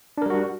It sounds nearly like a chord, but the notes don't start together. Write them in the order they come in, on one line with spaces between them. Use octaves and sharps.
D4 A#4 G3 F#4